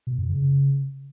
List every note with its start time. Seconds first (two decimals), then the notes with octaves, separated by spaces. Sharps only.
0.07 B2
0.18 F#2
0.30 C#3